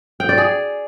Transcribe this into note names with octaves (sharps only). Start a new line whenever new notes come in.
G5
D5
G#4